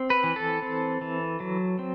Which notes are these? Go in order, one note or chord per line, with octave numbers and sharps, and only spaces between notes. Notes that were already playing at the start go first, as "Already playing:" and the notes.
Already playing: C4
B4
E3
A4
C4
E3
F#3
C4